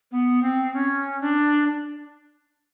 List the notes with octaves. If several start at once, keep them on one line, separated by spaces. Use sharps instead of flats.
B3
C4
C#4
D4